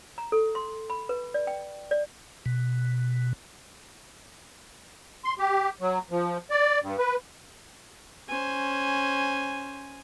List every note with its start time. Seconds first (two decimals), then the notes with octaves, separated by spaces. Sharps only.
0.18 A#5
0.32 A4
0.55 C6
0.90 B5
1.09 B4
1.34 D5
1.47 G5
1.91 D5
2.46 B2
5.25 C6
5.39 G4
5.81 F#3
6.11 F3
6.51 D5
6.83 G2
6.99 B4
8.28 C#4 C5 G#5